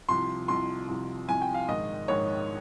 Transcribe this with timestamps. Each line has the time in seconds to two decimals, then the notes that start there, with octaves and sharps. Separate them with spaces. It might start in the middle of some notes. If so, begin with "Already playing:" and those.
0.09 C2 C3 F3 C6
0.48 C2 C3 F3 C6
0.88 C2 C3 F3
1.28 C2 C3 F3 G#5
1.42 G5
1.54 F5
1.68 A#1 G#2 D#3 D#5
2.08 A#1 G#2 D#3 C#5